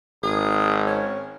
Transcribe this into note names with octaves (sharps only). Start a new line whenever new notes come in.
G#1 G#4
C#4